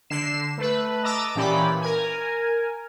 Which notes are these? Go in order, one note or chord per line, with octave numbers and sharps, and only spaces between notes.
D3 C7 E7
A3 B4
D#5 A5 A#5 D6 E6
A#2 E3 C#4 G4 D5 B5
A#4 G#5